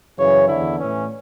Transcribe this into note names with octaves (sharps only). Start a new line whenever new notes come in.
F#2 C#3 E3 C#5
E2 D3 E4
A2 E3 C#4